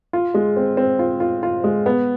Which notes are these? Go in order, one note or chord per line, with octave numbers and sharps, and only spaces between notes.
F4
G#3
C4
C4
F4
F4
F4
G#3
B3